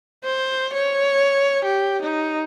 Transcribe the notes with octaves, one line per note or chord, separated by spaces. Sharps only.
C5
C#5
G4
D#4